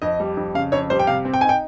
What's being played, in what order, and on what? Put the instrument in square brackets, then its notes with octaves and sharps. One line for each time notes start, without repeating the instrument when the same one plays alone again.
[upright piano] F2 D#5
G3
F2
C#3 F5
F2 C#5
G3 C5
G5
C3 F5
C4
G5
D#4 G#5
G5